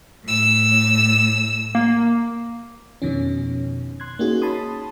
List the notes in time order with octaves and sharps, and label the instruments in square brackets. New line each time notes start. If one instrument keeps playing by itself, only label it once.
[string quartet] A2 E6
[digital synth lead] A#3
[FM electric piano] F2 B2 D#3 C#4
C6 F#6 G#6
A#3 C#4 D#4 F#4 G#4
C#5 A5 B5 C6 D#6